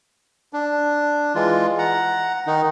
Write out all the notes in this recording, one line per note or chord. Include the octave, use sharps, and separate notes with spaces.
D4
E3 G#3 F4
F#5 A#5
D#3 D#4